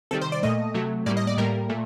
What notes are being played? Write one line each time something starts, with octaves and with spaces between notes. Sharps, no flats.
C3 D#3 G3 A4
C5
D5
A#2 A3 D#5
C3 F#3 A3
A2 G3 A#3 D5
D#5
D5
A2 G3 A#3 A#4
A#2 A3